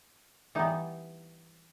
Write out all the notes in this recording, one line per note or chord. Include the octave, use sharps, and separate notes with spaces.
E3 G3 B3 D#4